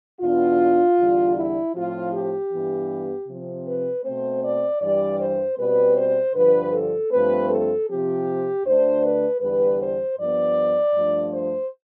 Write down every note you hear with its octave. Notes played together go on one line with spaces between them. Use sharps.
E2 B2 B3 D4 F4
E2 D3 G3
E4
A2 F3 C4 F4
G4
G2 E3 B3
C3 F3 C4
B4
B2 A3 C4 C5
D5
G2 E3 G3 D5
C5
B2 G3 C4 B4
C5
G2 D3 F3 B4
A4
G2 F3 A3 C4 B4
A4
C3 F3 C4 G4
D2 D3 A3 D4 C5
B4
E2 D3 G3 B4
C5
G2 F3 B3 D5
G2 F3 A3 D4
C5